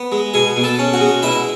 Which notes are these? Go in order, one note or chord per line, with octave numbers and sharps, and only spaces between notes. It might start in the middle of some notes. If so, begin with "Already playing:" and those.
Already playing: B3
G#3
B2 G#4 G#5
B2
A4 A5
C#4
F#4 F#5
G#3
B2 E4 E5